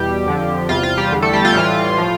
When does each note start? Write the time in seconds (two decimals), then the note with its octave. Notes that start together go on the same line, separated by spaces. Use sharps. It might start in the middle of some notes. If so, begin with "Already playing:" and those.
Already playing: E2 B2 G3 G4
0.26 F2 D3 F3
0.69 E2 C3 G3 F4
0.83 F4
0.97 G3 G4
1.12 E2 D3 G3
1.22 A3 A4
1.33 G3 G4
1.45 F4
1.55 A2 E3 G3
1.98 A2 F3